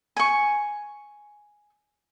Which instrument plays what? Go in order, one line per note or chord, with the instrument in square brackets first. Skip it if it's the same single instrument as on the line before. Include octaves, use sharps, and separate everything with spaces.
[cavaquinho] G#5 C#6